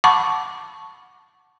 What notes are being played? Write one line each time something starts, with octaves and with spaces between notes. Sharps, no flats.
F#5 A5 B5 C#6 D6